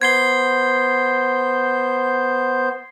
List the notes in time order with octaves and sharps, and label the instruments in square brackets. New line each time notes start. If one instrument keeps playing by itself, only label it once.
[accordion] B3 C5 G6 [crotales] G#6 C7 G7